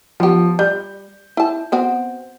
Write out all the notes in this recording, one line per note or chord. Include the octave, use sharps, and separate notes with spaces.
F3 B3 G4
G3 G6
E4 A5
B3 C4 F#4